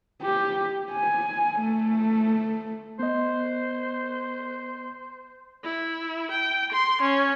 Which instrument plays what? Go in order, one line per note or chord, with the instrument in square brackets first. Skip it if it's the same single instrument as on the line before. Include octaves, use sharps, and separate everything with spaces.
[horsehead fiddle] G4
G#5
A3
[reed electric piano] B3 D#5 [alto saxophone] C5
[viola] E4
G5
C6
C#4